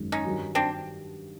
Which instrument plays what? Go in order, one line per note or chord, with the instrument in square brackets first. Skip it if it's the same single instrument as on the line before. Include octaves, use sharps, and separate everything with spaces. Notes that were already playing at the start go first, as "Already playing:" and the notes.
Already playing: [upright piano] G#1 F#2 D#3 G#3
[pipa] C#4 D#4
[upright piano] G2 D#3 F#3
[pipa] C4 D4